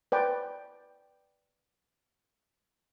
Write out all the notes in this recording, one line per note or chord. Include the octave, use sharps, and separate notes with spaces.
B4 D5 G5